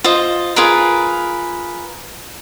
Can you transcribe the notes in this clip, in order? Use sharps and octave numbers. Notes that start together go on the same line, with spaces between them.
F4 C5 D#5
F4 G#4 A#4 B4